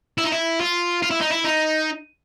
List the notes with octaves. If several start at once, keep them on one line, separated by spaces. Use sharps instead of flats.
E4
D#4
E4
F4
F4
E4
D#4
E4
D#4